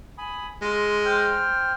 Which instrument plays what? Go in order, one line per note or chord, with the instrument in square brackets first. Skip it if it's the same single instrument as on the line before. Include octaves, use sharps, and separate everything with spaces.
[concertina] G#5 B5 D#6
[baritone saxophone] G#3 [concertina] F4
[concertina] C5 G5 F6